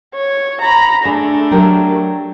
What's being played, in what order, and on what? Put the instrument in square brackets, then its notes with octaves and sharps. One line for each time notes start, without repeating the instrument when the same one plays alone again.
[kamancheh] C#5
A#5 B5
[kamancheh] A3 D4 [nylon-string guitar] G#4
[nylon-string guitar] F#3 G4 A#4